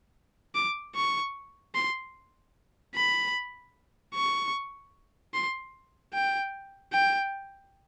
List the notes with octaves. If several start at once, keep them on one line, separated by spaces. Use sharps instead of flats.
D6
C#6
C6
B5
C#6
C6
G5
G5